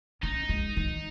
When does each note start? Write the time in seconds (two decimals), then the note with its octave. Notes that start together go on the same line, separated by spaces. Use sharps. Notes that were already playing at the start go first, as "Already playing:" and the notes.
0.23 C#4 D#4
0.49 G#3
0.77 D#3